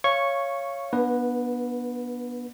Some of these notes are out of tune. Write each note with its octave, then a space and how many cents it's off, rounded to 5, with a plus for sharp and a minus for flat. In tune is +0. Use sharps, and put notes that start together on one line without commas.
C#5 +0 F5 -20 C#6 -10
B3 -30 D4 +0 B4 +0